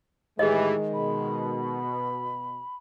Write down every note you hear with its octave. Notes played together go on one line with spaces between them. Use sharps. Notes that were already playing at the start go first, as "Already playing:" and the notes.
A2 D#3 E3 G#3 G4 G#4 D#5
B2 B5